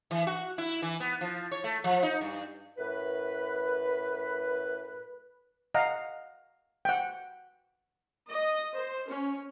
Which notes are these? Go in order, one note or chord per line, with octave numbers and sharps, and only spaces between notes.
E3
F#4
E4
E3
B3
F3
C#5
A3
F3
D#4
G2
F#2 A2 B4
D#5 F5 F#5 A#5
F#5 G5
D#5
C5
C#4